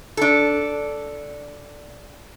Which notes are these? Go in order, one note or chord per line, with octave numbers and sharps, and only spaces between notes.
D4 A4